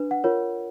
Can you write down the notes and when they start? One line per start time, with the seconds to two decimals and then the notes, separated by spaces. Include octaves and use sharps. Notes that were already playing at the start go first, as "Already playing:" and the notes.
Already playing: D4 B4
0.11 F#5
0.24 F4 A#4 C#5